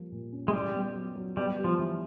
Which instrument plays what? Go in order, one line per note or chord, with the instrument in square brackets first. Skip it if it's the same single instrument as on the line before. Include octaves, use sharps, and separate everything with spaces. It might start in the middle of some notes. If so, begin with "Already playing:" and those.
Already playing: [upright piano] F3 G3 A#3
A#2
C#4
[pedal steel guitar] G#3
[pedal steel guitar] G3 [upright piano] E4
[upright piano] B3
F#3
F#3
[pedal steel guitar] G3 [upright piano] B3
[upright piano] G3
[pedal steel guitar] F3
[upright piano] E3